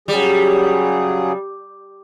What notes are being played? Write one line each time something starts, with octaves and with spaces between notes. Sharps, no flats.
C#3 F#3 G3 G#4